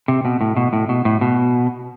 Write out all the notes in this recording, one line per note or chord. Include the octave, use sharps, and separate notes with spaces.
C3
B2
A2
B2
A2
B2
A2
B2